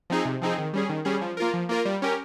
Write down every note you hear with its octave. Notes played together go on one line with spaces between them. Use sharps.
F3 C4 D#4 G#4
C3
F3 C4 D#4 G#4
D#3
G3 C#4 G#4
D#3
G3 C#4 G#4
F3
A#3 F4 A#4
F3
A#3 F4 A#4
G3
C#4 G4 A#4